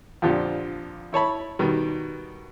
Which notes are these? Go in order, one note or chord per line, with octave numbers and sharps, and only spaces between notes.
F2 A#2 D3 F3 D4 G4
E4 C#5 A5 B5
B2 D#3 G3